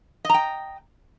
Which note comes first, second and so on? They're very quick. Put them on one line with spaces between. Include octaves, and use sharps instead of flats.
D#5 A#5 G5